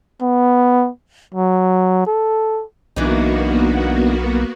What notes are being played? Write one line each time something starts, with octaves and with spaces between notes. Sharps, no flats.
B3
F#3
A4
B1 E3 A#3 B3 D4 D#4 F#4